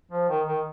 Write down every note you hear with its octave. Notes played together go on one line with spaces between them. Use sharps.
F3
D#3
D#3